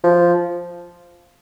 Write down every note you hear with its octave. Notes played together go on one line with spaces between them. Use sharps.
F3